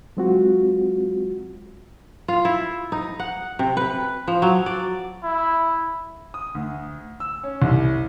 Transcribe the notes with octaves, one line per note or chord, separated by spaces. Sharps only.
F#3 G#3 C4 F4 F#4
F4
E4
D#4
F#5
C3
B4
F3
F#3
D5
E4
D#6
D2
E6
C#4
C2